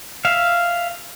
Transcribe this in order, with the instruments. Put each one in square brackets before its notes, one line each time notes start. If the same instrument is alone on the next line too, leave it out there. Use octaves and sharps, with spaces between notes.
[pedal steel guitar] E5 F5